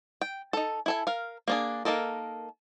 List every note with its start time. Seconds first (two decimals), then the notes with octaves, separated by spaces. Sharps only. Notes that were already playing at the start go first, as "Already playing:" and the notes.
0.21 G5
0.53 D#4 A4
0.86 E4 A4 G#5
1.07 A#4 F5
1.48 A#3 D4 G#4
1.85 A#3 D#4 A4 A#4